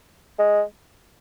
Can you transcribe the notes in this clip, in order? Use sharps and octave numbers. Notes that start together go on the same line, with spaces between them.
G#3